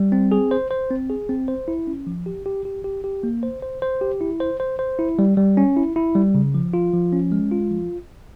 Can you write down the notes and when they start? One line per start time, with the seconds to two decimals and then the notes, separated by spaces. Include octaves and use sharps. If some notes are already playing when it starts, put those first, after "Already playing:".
Already playing: G3
0.12 C4
0.32 G#4
0.51 C5
0.71 C5
0.91 C4
1.10 G#4
1.29 C4
1.48 C5
1.68 E4
1.87 C#4
2.07 F3
2.26 G4
2.46 G4
2.65 G4
2.84 G4
3.04 G4
3.23 A#3
3.43 C5
3.62 C5
3.82 C5
4.01 G4
4.21 E4
4.40 C5
4.60 C5
4.79 C5
4.99 E4
5.19 G3
5.37 G3
5.57 C#4
5.77 E4
5.96 E4
6.15 G3
6.35 C#3
6.54 F3
6.74 F4
6.94 F3
7.13 C#4
7.32 G#3
7.52 F4
7.71 F3